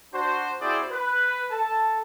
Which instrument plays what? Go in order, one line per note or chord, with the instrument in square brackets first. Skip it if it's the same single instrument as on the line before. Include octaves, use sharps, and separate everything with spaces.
[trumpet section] D4 F#4 C5
C4 E4 F#4 G#4 C5 D5
B4
A4 A5